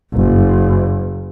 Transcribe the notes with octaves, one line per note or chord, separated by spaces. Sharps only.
F#1